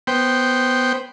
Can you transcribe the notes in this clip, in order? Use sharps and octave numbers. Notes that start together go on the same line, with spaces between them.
B3 C5 G5